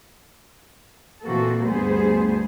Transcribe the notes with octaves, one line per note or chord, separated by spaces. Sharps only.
A#2 E3 A#3 C4 F#4 A4
D2 G2 G3 B3 G#4 C5